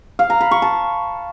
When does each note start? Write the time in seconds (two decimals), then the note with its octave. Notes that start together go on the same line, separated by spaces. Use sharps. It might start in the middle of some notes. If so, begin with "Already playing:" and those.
0.19 F5
0.30 A#5
0.41 B5
0.51 C#6
0.62 A5